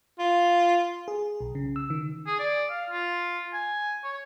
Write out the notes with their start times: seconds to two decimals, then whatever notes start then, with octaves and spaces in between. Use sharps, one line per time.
0.19 F4
1.08 G#4
1.41 B1
1.55 C#3
1.76 E6
1.90 D#3
2.27 G#4
2.39 D5
2.70 F5
2.90 F4
3.53 G#5
4.04 C#5